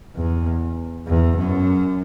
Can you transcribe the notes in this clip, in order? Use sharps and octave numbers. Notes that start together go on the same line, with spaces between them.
E2
E2
F#2